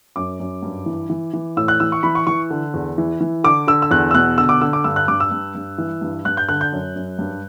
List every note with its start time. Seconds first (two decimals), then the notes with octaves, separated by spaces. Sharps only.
0.16 F#2 D6
0.40 F#2
0.62 G2
0.86 E3
1.10 E3
1.33 E3
1.57 A2 E6
1.68 F#6
1.80 E3 E6
1.92 C#6
2.03 E3 B5
2.15 C#6
2.27 E3 C#6
2.50 D3
2.74 E2
2.98 E3
3.21 E3
3.44 D3 D6
3.67 D3 E6
3.82 E6
3.91 E2 F#6
4.11 E6
4.14 B2 F#6
4.38 D3 E6
4.49 D6
4.61 D3 E6
4.73 D6
4.84 G2 E6
4.96 F#6
5.08 G2 D6
5.20 E6
5.31 G2
5.55 G2
5.78 E3
6.01 G2
6.25 G2 F#6
6.37 G6
6.49 D3 F#6
6.61 G6
6.72 F#2
6.96 F#2
7.19 G2